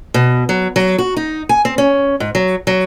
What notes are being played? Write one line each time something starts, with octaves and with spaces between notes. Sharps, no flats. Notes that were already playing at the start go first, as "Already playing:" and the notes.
B2
F#3
F#3
F#4
D#4
G#5
C4
C#4
G#2
F#3
F#3